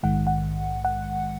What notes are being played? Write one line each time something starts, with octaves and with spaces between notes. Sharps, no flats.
A#1 G#2 D#3 G#3 F#5
F#5
F#5